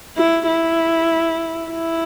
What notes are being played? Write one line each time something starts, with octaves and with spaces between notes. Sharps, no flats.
E4
E4
E4